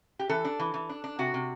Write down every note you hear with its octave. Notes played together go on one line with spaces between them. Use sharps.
G4
E3 A4
D4
E3
E3
D4
D4
C3 F#4
C3